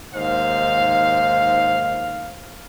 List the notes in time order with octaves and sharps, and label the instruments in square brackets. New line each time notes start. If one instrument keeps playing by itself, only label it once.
[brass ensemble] D#2 G#2 C5 F5